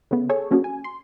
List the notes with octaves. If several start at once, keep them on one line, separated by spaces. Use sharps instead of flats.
C#3 A3 B3
G#4 A4 C#5
F#3 A#3 C#4 D4 F#4 G#4
G#5
C6